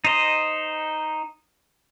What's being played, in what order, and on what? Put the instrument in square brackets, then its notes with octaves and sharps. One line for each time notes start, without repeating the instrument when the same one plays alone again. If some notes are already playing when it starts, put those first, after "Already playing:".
[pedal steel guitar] D#4 C5 D#5